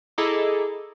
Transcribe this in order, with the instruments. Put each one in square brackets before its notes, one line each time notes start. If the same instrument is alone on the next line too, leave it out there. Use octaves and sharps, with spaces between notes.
[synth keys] E4 G#4 A4 D#5 A#5 D6